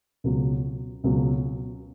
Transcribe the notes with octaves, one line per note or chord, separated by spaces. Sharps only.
C#2 B2 F#3
C#2 B2 F#3